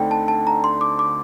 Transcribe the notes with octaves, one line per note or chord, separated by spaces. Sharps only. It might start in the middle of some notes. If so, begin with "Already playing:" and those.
Already playing: D2 D3 A3 C4 D#4 G5
A5
A5
A#5
C6
D6
D6